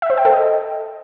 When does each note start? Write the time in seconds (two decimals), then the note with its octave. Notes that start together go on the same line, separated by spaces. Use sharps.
0.02 E5
0.10 C5
0.17 G5
0.25 A4
0.33 D#5